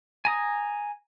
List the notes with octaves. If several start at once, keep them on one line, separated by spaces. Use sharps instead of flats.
G#5 A#5 D#6